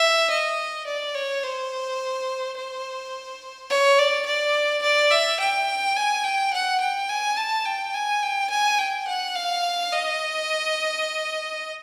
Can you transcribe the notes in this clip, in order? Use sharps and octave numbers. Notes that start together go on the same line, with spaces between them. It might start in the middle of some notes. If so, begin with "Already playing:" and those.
Already playing: E5
D#5
D5
C#5
C5
C5
C#5
D5
D5
D5
E5
G5
G#5
G5
F#5
G5
G#5
A5
G5
G#5
G5
G#5
G5
F#5
F5
D#5